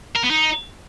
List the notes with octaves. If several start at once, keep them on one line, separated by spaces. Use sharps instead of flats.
A#4
B3
D#4